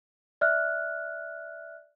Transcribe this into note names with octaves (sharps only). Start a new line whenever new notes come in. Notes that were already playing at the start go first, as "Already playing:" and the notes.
D5 E5 F6 F#6